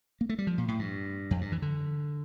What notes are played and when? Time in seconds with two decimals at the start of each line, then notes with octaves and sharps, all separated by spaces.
0.21 A#3
0.29 A3
0.38 G3
0.47 F3
0.58 A#2
0.68 A2
0.79 G2
1.31 F2
1.41 G2
1.52 E3
1.62 D3